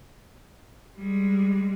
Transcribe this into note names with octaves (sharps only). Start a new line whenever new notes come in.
G3 G#3